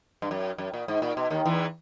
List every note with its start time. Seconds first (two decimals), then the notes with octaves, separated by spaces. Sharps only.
0.22 G2
0.31 F#2
0.58 F#2
0.74 A#2
0.88 G#2
1.02 A#2
1.17 B2
1.30 D#2 D#3
1.46 E2 E3